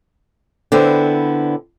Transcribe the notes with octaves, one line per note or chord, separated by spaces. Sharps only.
D3 B3 C4 E4